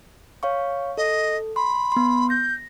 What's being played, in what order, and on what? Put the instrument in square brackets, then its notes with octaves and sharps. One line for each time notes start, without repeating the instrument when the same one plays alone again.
[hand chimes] C#5 F5 C#6
[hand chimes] A4 [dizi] D#5
[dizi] B5 [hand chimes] C6
[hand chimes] B3 C6
[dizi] G6 [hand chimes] A#6